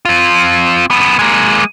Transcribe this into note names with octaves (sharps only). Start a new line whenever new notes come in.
C4 F4
F#2 B3
G#3 A#3